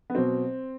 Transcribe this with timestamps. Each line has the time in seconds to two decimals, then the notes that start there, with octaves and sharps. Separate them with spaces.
0.10 B3
0.15 B2 F#3 C4